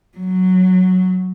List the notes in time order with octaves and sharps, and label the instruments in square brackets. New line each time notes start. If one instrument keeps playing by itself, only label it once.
[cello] F#3